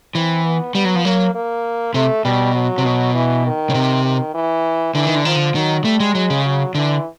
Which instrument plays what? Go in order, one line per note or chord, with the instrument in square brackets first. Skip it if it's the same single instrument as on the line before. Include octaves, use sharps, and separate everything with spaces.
[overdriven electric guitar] E3 [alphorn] C4
[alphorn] B3
[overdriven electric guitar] G3 [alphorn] B3
[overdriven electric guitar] F#3
F3
[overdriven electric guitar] F#3 [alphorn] A#3
[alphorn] A#3
[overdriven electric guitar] C3 [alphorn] A3
[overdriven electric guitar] B2 [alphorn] G3
[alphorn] F#3
[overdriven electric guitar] C3
B2
[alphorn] E3
D#3
[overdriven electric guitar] C#3
C3
[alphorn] D#3
E3
[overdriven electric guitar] D3 [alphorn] E3
[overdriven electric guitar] D#3
D3
[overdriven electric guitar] D#3 [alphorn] F3
[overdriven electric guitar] D3
[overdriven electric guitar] D#3 [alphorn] F#3
[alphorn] G3 [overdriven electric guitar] A3
[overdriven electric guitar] G#3
[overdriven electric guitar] F#3 [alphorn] G#3
[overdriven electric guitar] C#3
[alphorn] F#3
[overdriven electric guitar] D3 [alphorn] E3